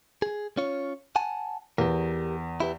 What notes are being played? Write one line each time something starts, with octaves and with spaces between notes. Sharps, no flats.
G#4
C#4 F4 C#5
F#5 G#5 A5
E2 G4 A#4
E4 G4 B4